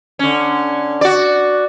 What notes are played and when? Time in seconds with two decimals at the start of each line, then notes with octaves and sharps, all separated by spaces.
0.19 D3 C#4
1.01 F#4 D5